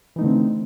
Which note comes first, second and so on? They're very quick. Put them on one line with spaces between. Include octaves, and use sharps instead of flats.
E3 D#4 A3 D3 C4